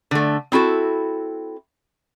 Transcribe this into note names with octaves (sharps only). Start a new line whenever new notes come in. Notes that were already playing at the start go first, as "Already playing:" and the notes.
D3 A3
C4 E4 F#4 A4